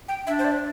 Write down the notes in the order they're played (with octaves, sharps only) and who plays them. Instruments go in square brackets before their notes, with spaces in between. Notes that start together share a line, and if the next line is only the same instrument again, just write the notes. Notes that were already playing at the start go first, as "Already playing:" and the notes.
[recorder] G5
[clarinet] D4 [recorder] E5
[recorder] C5
D5